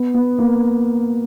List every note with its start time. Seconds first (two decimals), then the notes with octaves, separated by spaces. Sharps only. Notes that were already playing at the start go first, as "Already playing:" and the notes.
Already playing: B3
0.14 B3
0.39 A#3